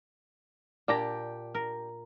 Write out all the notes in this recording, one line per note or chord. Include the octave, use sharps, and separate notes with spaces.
A#2 D4 G4 A#5
A#4